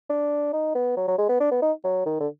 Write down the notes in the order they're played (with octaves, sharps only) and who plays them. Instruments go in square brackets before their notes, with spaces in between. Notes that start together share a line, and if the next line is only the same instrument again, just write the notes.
[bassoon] D4
D#4
B3
F#3
F#3
G#3
B3
D4
B3
D#4
F#3
D#3
D3